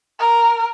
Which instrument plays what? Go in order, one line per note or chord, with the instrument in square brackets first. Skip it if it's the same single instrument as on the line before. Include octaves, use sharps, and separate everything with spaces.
[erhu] A#4